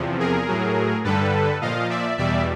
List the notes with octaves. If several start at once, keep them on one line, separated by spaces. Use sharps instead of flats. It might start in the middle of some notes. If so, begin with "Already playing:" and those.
Already playing: E2 C3 F3
G#4 A#4
A2 F#3
G2 D3 G3 A4 B4
A#2 F3 D#5 F5
D5 E5
E2 B2 G3 D5 E5